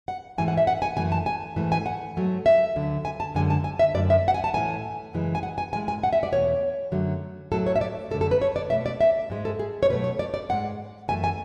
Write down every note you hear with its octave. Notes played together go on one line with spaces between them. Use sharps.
F#5
G#2 E3 A3 G#5
F#5
E5
F#5
G#5
F#2 E3 A3 G#5
A5
G#5
G#2 E3 A3
G#5
F#5
G#2 F#3 A3
E5
D2 D3 F#3
G#5
A5
F#2 D3 G#3 G#5
A5
G#5
E5
F#2 D3 A3 D5
E5
F#5
G#5
A5
A2 E3 A3 G#5
F#2 C#3 E3 G#3
G#5
F#5
G#5
A2 G#3 G#5
G#5
F#5
E5
D5
E2 B2 A3 C#5
F#2 D3 F#3 A3
A2 F#3 A3 A4
C#5
E5
D5
F#2 D3 A3 A4
A4
B4
C#5
D5
B2 A3 E5
D5
E5
G#2 G#3
A4
G#4
C#5
B2 F#3 A3 B4
C#5
D5
D5
G#2 G#3 F#5
F#2 E3 A3 G#5
G#5